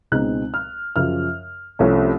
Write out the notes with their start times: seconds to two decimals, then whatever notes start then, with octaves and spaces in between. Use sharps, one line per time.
0.12 C#2 B2 G#3 C4 D#4 F#6
0.54 F6
0.96 F#2 C#3 F3 F6
1.79 C2 C3 F3 A3 C#4